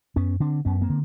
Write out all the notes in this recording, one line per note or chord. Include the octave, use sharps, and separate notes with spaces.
F#2 B3 C#4
D3 C4 D4
F#2 B3 C#4
A#3 C4
D3